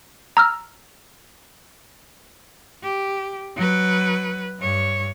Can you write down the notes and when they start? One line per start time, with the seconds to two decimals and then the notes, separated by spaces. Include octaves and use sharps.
0.37 A#5 E6 F6
2.83 G4
3.56 F#3 B4
4.60 G2 C#5